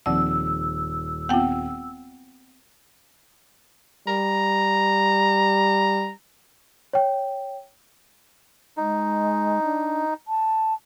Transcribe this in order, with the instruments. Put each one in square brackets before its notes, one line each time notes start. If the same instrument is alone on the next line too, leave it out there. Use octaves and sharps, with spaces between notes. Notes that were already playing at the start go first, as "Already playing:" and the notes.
[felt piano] D#1 [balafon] F3 C4 F#5 [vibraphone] E6
[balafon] B3 C4 F4 [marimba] F#5 G5
[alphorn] G3 [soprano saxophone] A#5
[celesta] C#5 G5
[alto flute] G#3 [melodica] D#4
[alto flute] D4
A5